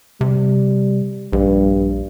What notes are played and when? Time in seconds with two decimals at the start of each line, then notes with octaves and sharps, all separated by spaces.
0.21 C3 G3
1.33 A#1 G2